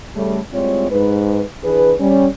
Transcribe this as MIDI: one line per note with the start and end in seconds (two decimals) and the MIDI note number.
0.15 0.39 49
0.15 0.39 55
0.15 0.39 57
0.52 0.90 45
0.52 0.90 55
0.52 0.90 56
0.52 0.90 60
0.52 0.90 65
0.52 0.90 73
0.90 1.41 44
0.90 1.41 71
1.63 1.93 52
1.63 1.93 62
1.63 1.93 68
1.63 1.93 71
1.99 2.27 55
1.99 2.27 61